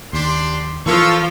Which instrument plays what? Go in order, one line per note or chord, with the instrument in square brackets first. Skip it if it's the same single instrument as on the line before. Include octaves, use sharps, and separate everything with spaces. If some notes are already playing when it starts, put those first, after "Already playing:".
[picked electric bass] D#2 [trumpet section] D4 G4 C6
[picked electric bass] E3 [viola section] F3 F4 [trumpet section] A4 C#6